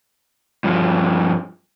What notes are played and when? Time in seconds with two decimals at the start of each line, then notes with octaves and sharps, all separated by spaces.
0.64 G2 F3